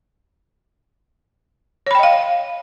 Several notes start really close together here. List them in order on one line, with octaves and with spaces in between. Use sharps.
C#5 B5 G5 D#5 F5